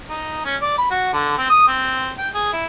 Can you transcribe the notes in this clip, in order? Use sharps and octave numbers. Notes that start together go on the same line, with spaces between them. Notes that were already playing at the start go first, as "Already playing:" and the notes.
D#4
C#4
D5
B5
F#4
D3
C4
D#6
C4
G5
G#4
E4